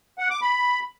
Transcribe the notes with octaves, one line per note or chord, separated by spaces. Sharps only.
F#5
D6
B5